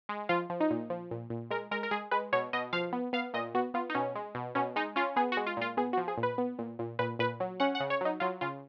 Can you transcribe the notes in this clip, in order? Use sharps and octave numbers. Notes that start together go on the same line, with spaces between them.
G#3
F3 F4
F3
D#4
A#2
F3
A#2
A#2
G#3 A#4
G#3 A#4
A#4
G#3 G#4
G#3 B4
B2 C#5
B2 D#5
F3 F5
B3
B3 F5
A#2 D#5
B3 F#4
B3 F4
D#4
B2 C#4
G#3
B2
B2 C#4
G#3 D#4
C#4 F4
B3 G#4
F#4
G#3
F4
A#2 F4
B3 G#4
F#4
F3
G#4
A#2
B4
B3
A#2
A#2
A#2 B4
A#2 B4
F#3
C#4 F#5
F#5
C#3
C#5
F#3 D#4
F#3 F4
C#3 F4